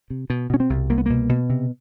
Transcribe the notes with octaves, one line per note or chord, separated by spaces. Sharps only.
C3
B2
B2 C#4
C4
C2
C2 A#3
B3
B2 A#3
B2
C3